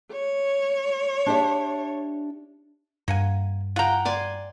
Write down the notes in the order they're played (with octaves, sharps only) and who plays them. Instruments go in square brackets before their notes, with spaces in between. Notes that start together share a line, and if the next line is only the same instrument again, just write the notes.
[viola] C#5
[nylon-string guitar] D4 G4 E5
[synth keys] G2 [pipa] A#3 F#5 G#5
[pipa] F4 A#5 [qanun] F#5 G5
[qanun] D5 G#5 C6